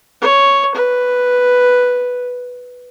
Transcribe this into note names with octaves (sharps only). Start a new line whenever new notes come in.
C#5
B4